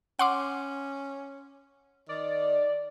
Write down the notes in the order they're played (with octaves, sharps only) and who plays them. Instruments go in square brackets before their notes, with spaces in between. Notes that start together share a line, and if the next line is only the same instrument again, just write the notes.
[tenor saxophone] C#4 [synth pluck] F#5 C6 D6
[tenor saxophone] D#3 [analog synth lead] D5